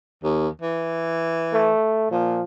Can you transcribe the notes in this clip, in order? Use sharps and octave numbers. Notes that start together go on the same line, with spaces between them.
D#2
E3
A3
A#2 F3